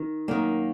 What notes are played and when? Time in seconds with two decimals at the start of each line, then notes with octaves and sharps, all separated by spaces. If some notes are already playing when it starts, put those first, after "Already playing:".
Already playing: D#3
0.28 F#2 D#3 A#3